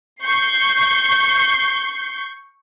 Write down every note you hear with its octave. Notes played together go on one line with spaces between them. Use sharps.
C#6 G6 C7